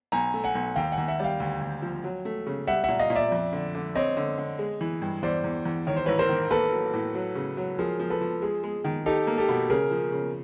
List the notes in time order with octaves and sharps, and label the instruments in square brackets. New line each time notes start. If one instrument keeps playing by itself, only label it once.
[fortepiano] B1 [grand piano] G#5 A#5
[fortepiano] A3
[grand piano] F#5 G#5
[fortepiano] B1
[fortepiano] D#2 [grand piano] F5 G5
[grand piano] F#5 G#5
[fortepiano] D#2
[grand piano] E5 F#5
[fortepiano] G3 [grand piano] F5 G5
[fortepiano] D2
D2
F3
F#3
A3
C#3
[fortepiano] G3 [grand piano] E5 F#5
[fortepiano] A#2 [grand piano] E5 F#5
[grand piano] D#5 F5
[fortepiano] A#2
[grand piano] D5 E5
[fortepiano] F2
D3
D3
[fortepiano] C4 [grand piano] C#5 D#5
[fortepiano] D3
D3
G#3
E3
G2
[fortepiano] E2 [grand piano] C5 D5
[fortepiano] E2
E2
[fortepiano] D#3 [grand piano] C#5
[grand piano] C5
[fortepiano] A1 [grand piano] B4 C#5
[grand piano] A#4 C5
[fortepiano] D#3
[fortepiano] A#3 [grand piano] A4 B4
[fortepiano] F#3
A2
F#3
C#3
F#3
[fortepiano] F3 [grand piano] G#4 A#4
[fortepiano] F3
[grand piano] A4 B4
[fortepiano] F3
[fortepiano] G#3 [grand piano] G#4
[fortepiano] G#3
D#3
[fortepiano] D#4 [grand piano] G4 A4
[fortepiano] A#3
[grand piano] G4 A4
[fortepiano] B2
[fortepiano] C#3 [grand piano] G#4 A#4
[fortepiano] F3
C#3